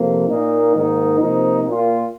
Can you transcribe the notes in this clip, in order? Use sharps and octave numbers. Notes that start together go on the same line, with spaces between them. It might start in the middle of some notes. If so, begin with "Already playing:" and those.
Already playing: F2 C3 F3 A#3
A#2 A#3 D#4
G#2 D#3 A#3 D#4
C3 F3 A#3 D#4
A#2 A#3 F4